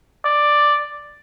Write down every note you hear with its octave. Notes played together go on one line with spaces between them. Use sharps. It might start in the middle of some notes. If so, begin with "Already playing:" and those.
D5